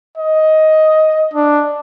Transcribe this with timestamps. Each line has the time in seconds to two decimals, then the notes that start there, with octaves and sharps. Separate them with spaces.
0.17 D#5
1.33 D4